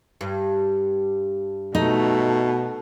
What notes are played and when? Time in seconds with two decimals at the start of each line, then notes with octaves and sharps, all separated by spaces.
0.21 G2
1.75 B2 A3 D#4